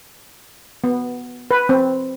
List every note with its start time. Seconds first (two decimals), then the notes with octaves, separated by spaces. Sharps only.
0.84 B3
1.51 B4
1.69 C4